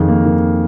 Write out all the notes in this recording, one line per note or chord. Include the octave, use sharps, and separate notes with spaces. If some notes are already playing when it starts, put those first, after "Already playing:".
Already playing: F2 D#3 G#4
A#3
D#3